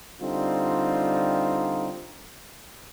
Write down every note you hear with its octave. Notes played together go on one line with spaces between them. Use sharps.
D3 G3 C4 D#4 F4